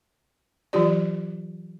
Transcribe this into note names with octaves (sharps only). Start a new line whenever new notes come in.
E3 F#3 F4 G4 D5